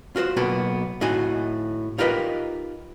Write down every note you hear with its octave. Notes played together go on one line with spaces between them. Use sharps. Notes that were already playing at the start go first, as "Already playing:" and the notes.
F4 F#4 A#4 C5
B1 A#3 B3 F#4 A5
A2 D#4 F#4 G#5
D#4 F4 G4 A#4 B4 D#5